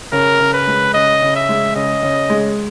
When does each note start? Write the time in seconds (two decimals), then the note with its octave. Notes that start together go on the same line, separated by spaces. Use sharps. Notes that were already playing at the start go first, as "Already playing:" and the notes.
0.12 C#3 A#4
0.40 C#3
0.53 B4
0.67 G#3
0.94 C#3 D#5
1.22 C#3
1.35 E5
1.49 G#3
1.75 C#3 D#5
2.03 C#3
2.30 G#3